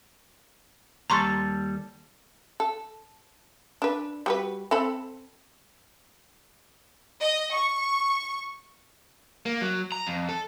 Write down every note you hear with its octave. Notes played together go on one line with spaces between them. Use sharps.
D#2 G3 A4 A#5 C6 C#6
A4
D4 B4
G3 F#4 B4
C4 A4 B5
D#5
C#6
A#3
F#3
A#5
F2
A4